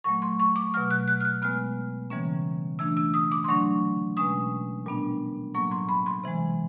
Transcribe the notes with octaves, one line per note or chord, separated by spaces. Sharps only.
A#2 F#3 A3 C#6
C6
C#6
D6
B2 F#3 A3 F6
F#6
F#6
F6
F#6
B2 G#3 B3 F6
C#3 E3 G3 A#3 C#4
E3 A3 D4 E6
E6
D#6
D6
C6
D3 F#3 A3 D4 C#6
B2 G#3 C#4 D#6
A#2 G3 B3 D4
A2 F#3 A#3 C#6
C6
B5
C6
C3 E3 G#3